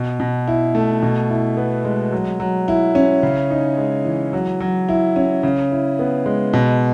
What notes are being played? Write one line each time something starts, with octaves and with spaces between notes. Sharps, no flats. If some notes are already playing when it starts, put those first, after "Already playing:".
Already playing: B2
B2
E4
A3
B2
E4
B3
G#3
F#3
F#3
E4
C#4
C#3
D#4
G#3
E3
F#3
F#3
E4
C#4
C#3
E4
B3
G#3
B2